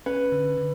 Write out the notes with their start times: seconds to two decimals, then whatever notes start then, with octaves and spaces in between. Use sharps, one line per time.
0.06 C#4 B4
0.32 D3
0.58 D3